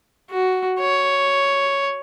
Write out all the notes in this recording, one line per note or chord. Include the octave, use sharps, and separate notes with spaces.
F#4
C#5